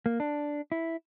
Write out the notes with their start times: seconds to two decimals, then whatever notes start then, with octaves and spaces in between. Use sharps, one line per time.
0.06 A#3
0.20 D4
0.72 E4